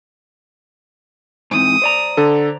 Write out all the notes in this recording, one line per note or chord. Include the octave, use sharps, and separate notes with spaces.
G#2 E3 C4 D#6
C5 D5 A#5
D3 A4